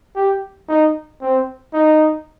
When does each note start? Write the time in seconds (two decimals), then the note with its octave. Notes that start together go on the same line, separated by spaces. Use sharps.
0.16 G4
0.68 D#4
1.21 C4
1.74 D#4